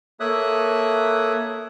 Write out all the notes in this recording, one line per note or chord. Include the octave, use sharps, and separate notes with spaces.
A#3 A4 C#5 E5 D#6 F#6